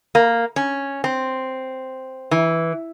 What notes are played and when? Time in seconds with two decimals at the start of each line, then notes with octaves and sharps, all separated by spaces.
0.15 A#3
0.56 C#4
1.04 C4
2.31 E3